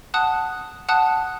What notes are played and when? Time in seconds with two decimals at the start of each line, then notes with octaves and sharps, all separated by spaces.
0.14 F#5 A5 D#6 F#6
0.89 F#5 A5 D#6 F#6